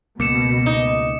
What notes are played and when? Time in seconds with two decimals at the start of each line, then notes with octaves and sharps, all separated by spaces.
0.20 C#2 B2 A3 A#3 D6 C#7 E7
0.66 D#4